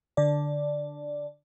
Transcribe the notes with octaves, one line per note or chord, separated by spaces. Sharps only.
D3 D5